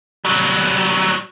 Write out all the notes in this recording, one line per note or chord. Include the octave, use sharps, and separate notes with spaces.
F#3 G3